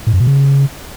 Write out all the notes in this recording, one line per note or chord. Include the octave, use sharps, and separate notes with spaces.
A2
F#2
B2
C#3